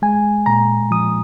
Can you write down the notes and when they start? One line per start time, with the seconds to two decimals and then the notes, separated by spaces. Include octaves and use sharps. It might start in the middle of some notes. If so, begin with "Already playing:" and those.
0.02 G#3 G#5
0.46 A#2 A#5
0.91 F3 D#6